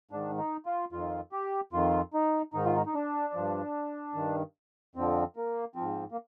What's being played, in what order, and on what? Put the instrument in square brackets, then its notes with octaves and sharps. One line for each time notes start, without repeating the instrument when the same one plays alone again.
[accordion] G#2 D#3 D4
D#4
F4
F2 D#3 F4
G4
F2 D#3 F4
D#4
G#2 D#3 D#4
F4
D#4
D#4
D4
G2 F3
G2 D#3
F2 D3 F3 C4
A#3
F3 C4
G#2
A#3